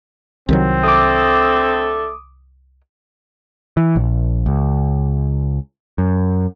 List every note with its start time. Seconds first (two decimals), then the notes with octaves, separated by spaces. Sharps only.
0.49 C2 D#3 F#3 C4
0.83 D3 A3 A4 D6 D#6
3.77 E3
3.96 A#1
4.46 C#2
5.98 F#2